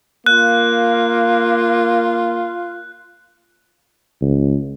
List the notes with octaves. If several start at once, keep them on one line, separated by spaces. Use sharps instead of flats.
A#3 F4 F#6
C#2